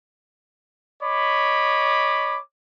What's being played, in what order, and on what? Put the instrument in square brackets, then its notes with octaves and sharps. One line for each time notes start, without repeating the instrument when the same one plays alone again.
[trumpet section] C#5 D#5 B5 D6